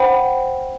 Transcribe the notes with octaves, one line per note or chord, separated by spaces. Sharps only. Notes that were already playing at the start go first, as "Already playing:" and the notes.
Already playing: C5 F#5 G5 B5